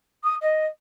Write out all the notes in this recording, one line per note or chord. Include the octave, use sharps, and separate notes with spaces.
D#6
D#5